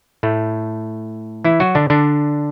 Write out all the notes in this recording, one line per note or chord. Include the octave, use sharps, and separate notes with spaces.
A2 A3
E3 E4
F#3 F#4
D3 D4
D3 D4